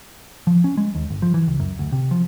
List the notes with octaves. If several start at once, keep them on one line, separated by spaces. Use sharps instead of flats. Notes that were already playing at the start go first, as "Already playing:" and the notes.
F3
C#4
G#3
D#2
G1
F3
E3
C#2
F#2
D2
C3
F3